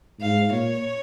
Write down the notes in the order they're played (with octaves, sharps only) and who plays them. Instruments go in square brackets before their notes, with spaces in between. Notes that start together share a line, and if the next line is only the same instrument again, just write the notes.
[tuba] G#2 [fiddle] F5
[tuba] A#2 [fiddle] C#5